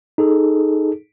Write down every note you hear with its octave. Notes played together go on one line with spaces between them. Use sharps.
D#4 G#4 A4